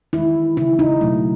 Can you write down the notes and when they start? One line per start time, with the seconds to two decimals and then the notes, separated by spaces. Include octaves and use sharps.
0.13 D#3 G#3 E4
0.57 C#3 G#3 E4
0.79 D#4
1.01 B2 F#3 A3